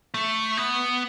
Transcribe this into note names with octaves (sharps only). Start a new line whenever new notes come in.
A3
B3